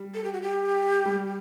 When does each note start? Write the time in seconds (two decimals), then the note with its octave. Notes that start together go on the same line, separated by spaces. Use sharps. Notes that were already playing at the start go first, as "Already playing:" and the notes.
Already playing: G3
0.14 A4
0.24 G4
0.33 F#4
0.42 G4
1.06 G3